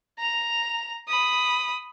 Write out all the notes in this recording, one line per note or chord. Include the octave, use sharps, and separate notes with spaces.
A#5 F7
B5 D#6